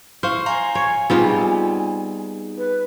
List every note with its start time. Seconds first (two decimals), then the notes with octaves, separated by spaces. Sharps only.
0.23 E4 C5 F5 C#6 F6
0.46 F5 G#5 A#5 C6
0.75 C#5
1.10 G3 B3 C4 D#4 F4 G#4
2.57 B4